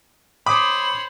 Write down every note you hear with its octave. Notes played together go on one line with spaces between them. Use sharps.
C5 C#5 B5 D6 D#6 F#7